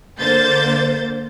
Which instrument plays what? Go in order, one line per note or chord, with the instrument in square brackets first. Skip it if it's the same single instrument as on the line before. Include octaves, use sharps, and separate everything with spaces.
[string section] D3 A#3 C5 G6 A6